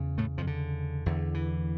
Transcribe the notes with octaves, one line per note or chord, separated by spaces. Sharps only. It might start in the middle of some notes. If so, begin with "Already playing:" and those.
Already playing: E2 C#3
A2 A3
F2 F3
D3
E2 D3
E3